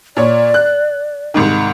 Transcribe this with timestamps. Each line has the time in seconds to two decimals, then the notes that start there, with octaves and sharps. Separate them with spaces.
0.17 A#2 C#5 D5
0.54 F#6
1.34 C2 G#2 D#3